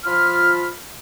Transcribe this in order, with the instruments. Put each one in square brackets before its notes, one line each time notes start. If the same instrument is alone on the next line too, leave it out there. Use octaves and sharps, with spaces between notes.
[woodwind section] F3 F4 B5 F6